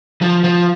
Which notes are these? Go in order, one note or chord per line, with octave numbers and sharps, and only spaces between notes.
F3
F3